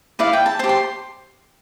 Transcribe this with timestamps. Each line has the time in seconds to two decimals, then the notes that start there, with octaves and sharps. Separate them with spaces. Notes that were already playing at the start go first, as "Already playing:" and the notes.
0.19 E4 B4 D5 F5
0.33 G5
0.46 A5
0.59 G4 C5 A5
0.69 C6